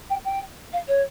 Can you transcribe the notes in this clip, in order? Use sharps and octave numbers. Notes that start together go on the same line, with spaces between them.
G5
G5
F5
C#5